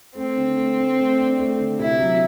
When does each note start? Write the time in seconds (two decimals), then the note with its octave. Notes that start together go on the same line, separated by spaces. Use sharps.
0.15 A3 C4
0.37 D3
0.57 A3
0.78 A3
0.98 A3
1.18 D4
1.39 A3
1.59 D3
1.79 C3 E4
2.00 F#3